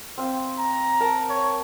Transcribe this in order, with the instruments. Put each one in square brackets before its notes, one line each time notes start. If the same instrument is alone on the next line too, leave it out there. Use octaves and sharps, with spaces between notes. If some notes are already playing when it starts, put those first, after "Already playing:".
[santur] C4 F5
[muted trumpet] A#5
[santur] A#4 A5
[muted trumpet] C#5